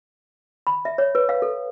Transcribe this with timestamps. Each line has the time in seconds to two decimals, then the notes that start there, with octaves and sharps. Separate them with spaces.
0.67 B5
0.85 E5
0.98 C#5
1.15 B4
1.29 F5
1.42 A4